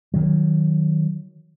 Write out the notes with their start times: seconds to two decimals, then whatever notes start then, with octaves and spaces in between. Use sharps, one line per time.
0.14 D#3 F#3